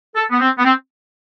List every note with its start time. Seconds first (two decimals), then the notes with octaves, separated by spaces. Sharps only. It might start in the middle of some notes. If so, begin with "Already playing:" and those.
0.16 A4
0.30 B3
0.40 C4
0.58 B3
0.64 C4